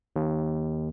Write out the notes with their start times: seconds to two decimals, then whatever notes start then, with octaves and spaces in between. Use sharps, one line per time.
0.16 D#2